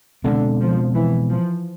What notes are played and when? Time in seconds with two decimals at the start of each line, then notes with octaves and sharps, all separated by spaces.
0.24 B2 D3 G#3 C4
0.59 F3
0.94 E3
1.29 F3